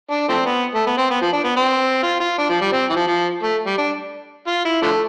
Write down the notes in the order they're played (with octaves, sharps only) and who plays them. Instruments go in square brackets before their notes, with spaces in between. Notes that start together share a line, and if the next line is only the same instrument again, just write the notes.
[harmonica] D4
F3 A3 C4
B3
A3
B3
C4
B3
F3
D4
B3
C4
F4
F4
D4
F3
G3
C4
E3
F3
F3
A3
G3
D4
F4
E4
D3 F3 A3